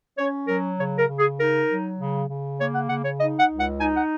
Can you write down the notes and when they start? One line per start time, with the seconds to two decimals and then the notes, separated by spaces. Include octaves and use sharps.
0.18 C#4 C#5
0.48 F#3 A#4
0.78 C#3 C#5
0.98 A#4
1.08 C#3
1.19 G#4
1.38 D#4 A#4
1.69 F#3
1.99 C#3
2.29 C#3
2.60 A#3 C#5
2.74 F#5
2.90 C#3 F#5
3.05 C#5
3.20 D#4 D#5
3.40 F#5
3.51 C#2
3.60 F#5
3.80 D#4 G#5
3.95 F#5